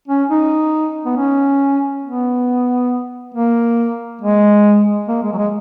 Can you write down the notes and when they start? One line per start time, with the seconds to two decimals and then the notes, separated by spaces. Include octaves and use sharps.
0.08 C#4
0.30 D#4
1.05 B3
1.17 C#4
2.04 B3
3.34 A#3
4.22 G#3
5.09 A#3
5.23 G#3
5.33 F#3
5.38 G#3